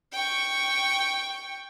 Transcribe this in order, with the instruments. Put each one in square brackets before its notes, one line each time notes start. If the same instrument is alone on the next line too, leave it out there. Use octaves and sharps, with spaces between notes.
[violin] G5 C#6